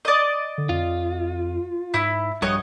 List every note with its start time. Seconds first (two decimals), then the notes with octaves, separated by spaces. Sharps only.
0.05 D5 D#5
0.58 D3
0.69 F2 F4
1.94 G#2 E4
2.42 A#1 G2 F#4 C#5 D#5